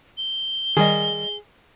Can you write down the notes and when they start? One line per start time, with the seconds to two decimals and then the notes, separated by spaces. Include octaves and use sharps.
0.18 G7
0.77 D#3 G3 G#4 D#5